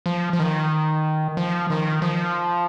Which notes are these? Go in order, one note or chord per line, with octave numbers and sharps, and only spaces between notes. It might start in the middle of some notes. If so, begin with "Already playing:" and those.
F3
F3
D#3
F3
D#3
F3